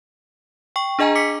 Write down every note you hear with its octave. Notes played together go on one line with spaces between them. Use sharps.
G5 C#6
D4 G#4 D#5 G#5 A#5
D6 B6 C#7